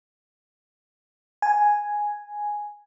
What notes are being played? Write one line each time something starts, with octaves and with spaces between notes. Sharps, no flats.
G#5